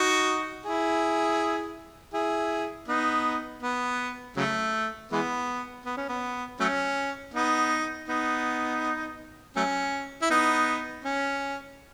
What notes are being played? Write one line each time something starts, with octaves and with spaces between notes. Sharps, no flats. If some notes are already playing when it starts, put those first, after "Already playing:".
Already playing: D#4 F#4
E4 G#4
E4 G#4
B3 D#4
B3
C#3 F#3 A3
E3 G#3 B3
B3
C#4
B3
F#3 A3 C#4
B3 D#4
B3 D#4
F#3 A3 C#4
E4
B3 D#4
C#4